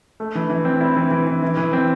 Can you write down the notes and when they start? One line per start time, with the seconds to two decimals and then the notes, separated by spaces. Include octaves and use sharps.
0.20 A3
0.35 E3
0.49 E3
0.65 C4
0.81 E4
0.96 E3
1.11 E3
1.27 E3
1.42 E3
1.57 E3
1.73 C4